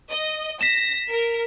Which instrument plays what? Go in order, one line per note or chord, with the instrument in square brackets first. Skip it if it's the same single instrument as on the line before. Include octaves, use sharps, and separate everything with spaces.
[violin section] D#5
[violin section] A#6 [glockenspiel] B6 E7
[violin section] A#4